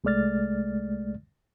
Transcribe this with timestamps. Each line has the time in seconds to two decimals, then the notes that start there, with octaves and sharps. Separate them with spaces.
0.04 C2 G#3 A3 D5 F6 A6